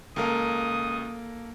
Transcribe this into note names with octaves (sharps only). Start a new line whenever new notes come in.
C#2 A#3 A4 A#4 F5 D#6